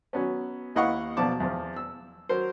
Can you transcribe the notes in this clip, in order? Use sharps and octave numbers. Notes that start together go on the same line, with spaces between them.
F#3 B3 C#4
D#2 E4 D#5 F5 F#5 C#6
B1 B2 F3 D5 A5 D6
E2 F3
E6
F#3 A#4 C5